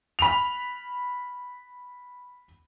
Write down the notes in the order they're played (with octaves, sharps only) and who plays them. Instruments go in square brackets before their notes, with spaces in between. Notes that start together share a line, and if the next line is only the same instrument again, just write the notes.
[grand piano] B5 F7